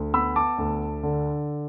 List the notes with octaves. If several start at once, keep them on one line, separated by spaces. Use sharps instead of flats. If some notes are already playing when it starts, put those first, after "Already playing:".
Already playing: D2
B3 B5 E6
A5 D6
D2
D3